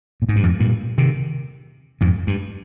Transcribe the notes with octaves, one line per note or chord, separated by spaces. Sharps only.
A#2
G#2
G2
F2 G#2
G2 A#2
C3 D#3
F2 G#2
G2